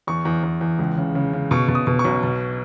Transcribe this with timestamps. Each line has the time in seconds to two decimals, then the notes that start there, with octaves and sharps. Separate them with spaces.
0.07 E2 C#6
0.25 E2
0.43 E2
0.61 E2
0.79 C#2
0.97 C#3
1.15 C#3
1.33 C#3
1.51 B2 C#6
1.68 B2
1.75 D#6
1.87 B2
1.99 C#6
2.05 B1
2.23 B2